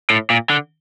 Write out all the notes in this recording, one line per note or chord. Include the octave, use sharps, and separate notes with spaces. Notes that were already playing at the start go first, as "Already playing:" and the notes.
A2
A#2
D3